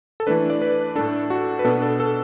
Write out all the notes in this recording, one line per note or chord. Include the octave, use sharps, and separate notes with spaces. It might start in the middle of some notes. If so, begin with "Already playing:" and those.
A4
E3 A3 D4 B4
D5
B4
A2 A3 D4 A4
F#4
B4
B2 B3 D4 A4
A4
A4